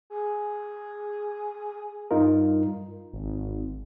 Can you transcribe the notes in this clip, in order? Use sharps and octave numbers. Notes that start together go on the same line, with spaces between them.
G#4
G2 D#4 F4 A#4
G#1